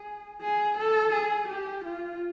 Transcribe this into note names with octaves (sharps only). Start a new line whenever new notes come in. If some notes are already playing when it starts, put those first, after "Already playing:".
Already playing: G#4
G#4
A4
G#4
G4
F4